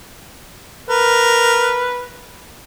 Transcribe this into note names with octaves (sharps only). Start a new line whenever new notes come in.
A#4 B4